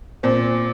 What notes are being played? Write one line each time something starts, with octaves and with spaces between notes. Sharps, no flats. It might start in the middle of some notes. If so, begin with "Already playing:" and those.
A#2 C4